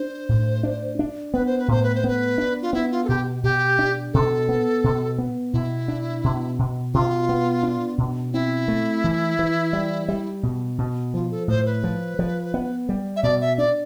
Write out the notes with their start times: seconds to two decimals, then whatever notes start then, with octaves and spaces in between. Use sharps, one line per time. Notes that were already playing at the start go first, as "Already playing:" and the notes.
Already playing: D4 C5
0.29 A2
0.63 D4
0.99 D4
1.34 B3 B4
1.46 C5
1.59 B4
1.68 A2 C5
1.83 B4
1.95 C5
2.04 B3 B4
2.38 D4
2.62 F4
2.73 B3 E4
2.91 F4
3.05 A4
3.09 B2 G4
3.43 B2 G4
3.79 D4
4.13 B2 A4
4.49 B3
4.84 B2
5.18 B3
5.53 B2 E4
5.88 D4
6.24 B2
6.59 B2
6.93 B2 F4
7.29 B3
7.63 D4
7.98 B2
8.33 C4 E4
8.68 A3
9.04 E3
9.39 E3
9.73 G3
10.08 G3
10.43 B2
10.78 B2
11.14 F3 F4
11.31 A4
11.48 A2 C5
11.66 B4
11.84 F3
12.19 F3
12.54 B3
12.89 G3
13.16 E5
13.23 B2 D5
13.41 E5
13.58 D4 D5